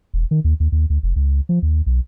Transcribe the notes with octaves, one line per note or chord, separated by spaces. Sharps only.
E1
D#3
D#2
D#2
D#2
D2
F1
C#2
F3
D#2
B1